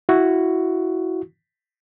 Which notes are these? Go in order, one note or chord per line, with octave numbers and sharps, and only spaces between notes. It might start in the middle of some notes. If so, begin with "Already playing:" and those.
E4 F#4